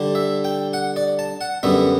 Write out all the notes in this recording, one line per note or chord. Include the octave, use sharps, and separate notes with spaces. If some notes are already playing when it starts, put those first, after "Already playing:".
Already playing: D3 G3 D4
E5
G5
F#5
D5
A5
F#5
F#2 D3 G3 B3 E5